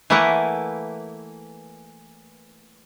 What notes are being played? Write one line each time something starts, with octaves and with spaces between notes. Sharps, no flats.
E3 A3 A#3 E4 B4 F#5